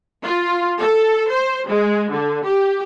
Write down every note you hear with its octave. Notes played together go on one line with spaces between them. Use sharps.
F4
A4
C5
G#3
D3
G4